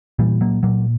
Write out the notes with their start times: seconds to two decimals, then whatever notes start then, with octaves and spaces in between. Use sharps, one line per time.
0.19 A#2 E3 G3
0.41 F#3 A#3
0.63 A#2 F#3 A#3